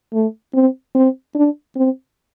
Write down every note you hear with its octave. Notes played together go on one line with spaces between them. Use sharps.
A3
C4
C4
D4
C4